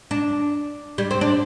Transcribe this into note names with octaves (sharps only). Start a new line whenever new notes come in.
D4
G3
C4
D4